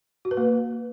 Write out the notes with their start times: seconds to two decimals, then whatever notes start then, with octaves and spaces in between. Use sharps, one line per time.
0.25 F#4
0.31 B4
0.37 A#3